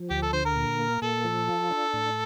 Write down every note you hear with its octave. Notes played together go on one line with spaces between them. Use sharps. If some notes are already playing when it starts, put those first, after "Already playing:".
Already playing: F3
D2 G4
A4
D3 C5
A#4
A#2
A#3
A#2 A4
F3
F4
D4
A2